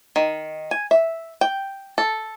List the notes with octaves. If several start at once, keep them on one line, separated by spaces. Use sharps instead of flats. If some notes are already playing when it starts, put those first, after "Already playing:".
D#3
G#5
E5
G5
A4